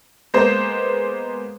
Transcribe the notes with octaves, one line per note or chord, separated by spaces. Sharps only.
G#3 A#3 B3 C5